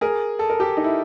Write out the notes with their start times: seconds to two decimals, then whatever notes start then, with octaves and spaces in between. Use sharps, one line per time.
0.01 G#4 A#4
0.39 A4
0.50 A#4
0.60 G4 A4
0.77 D#4
0.84 E4